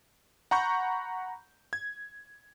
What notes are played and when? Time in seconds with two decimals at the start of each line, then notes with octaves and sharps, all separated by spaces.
0.51 F#5 A#5 B5 C#6 G6
1.73 G#6